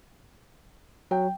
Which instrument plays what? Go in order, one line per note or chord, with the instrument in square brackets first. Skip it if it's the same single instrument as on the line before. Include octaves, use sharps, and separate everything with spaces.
[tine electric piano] F#3 [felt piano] G5